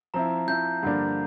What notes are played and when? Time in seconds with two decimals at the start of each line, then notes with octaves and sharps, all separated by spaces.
0.14 F3 C4 E4 A#5
0.48 F3 C4 E4 G6
0.83 G2 D3 F3 A#3 D4